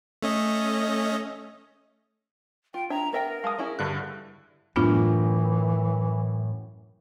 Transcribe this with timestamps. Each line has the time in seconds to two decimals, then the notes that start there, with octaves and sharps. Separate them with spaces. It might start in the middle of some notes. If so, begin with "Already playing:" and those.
0.22 A3 C#4 D#5
2.74 F4 G5
2.90 D4 E5 G5 A#5
3.13 B3 A#4 E5 G5
3.44 G#3 F5 A5 D#6
3.58 C#4 E4 G#4
3.79 G2 D3 F#6
4.76 F#2 A2 E3 B3 D4 F4